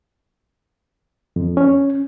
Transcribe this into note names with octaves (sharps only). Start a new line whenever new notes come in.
F2
C#4